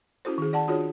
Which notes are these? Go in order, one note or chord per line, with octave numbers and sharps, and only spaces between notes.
C#4 E4 F#4 A4 C5
D#3 G#4
D5 F#5 A5
D4 F4 F#4 G#4 C#5